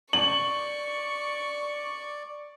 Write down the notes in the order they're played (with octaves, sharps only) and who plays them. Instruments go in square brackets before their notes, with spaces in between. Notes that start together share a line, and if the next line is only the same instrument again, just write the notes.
[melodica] D5 [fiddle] C#6 [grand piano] F#7